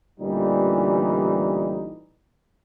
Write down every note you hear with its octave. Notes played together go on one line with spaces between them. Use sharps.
A1 A#2 D3 E3 G3 D#4